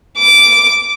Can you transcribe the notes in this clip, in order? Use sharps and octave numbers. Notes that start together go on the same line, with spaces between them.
D6